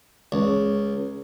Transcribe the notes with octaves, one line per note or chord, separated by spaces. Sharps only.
C#2